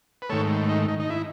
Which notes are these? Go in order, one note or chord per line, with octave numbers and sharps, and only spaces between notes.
B4
G#2 D#3 A3 A4 C#5
D#4
D#4
D#4
E4